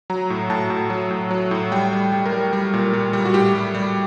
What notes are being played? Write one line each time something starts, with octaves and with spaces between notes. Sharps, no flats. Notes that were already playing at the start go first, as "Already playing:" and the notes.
F#3 A#5
A2
A2 A5
A2
F#3
A2
F#3
A2
G3 G5
G3
G3
A#4
G3
G3
A#2
G3
G3
F#4
A2 G4
G3
G3